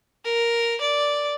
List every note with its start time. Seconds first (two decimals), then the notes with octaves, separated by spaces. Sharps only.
0.24 A#4
0.81 D5